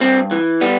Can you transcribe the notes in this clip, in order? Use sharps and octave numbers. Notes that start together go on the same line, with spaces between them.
G2 C4
E3
G3 B3